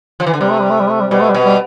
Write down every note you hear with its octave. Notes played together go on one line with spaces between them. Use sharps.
F3
E3
D3
C3 G3
A3
G3
A3
G3
A3
G3
B2 G3
A3
G3
B2
G3